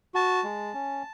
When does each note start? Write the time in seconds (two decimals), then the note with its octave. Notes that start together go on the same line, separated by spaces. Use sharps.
0.14 F#4 A5
0.44 G#3
0.73 C#4